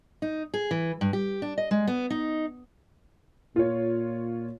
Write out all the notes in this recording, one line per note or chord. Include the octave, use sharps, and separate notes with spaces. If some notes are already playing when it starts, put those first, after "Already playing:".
D#4
G#4
E3
G2
G4
D4
D#5
G#3
B3
D#4
A#2 F4 C#5